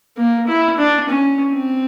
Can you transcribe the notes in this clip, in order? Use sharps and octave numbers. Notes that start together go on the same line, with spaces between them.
A#3
E4
D4
C#4
C4